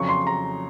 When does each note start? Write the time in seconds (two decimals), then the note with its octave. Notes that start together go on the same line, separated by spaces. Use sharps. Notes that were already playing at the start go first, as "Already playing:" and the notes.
Already playing: F2 C#3 F#3 C#6
0.09 C6
0.27 A#5